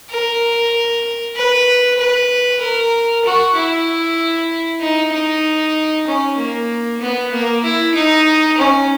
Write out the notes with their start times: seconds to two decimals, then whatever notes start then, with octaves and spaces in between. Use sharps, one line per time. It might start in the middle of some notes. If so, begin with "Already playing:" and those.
0.10 A#4
1.36 B4
1.99 B4
2.61 A#4
3.24 F#4
3.55 E4
4.80 D#4
5.13 D#4
6.07 C#4
6.37 A#3
7.01 B3
7.32 A#3
7.64 E4
7.95 D#4
8.58 C#4